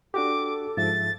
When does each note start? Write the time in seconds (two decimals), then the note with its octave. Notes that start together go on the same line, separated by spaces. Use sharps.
0.14 D4 F#4 G4 A4 D6
0.77 G#2 F3 E5 A6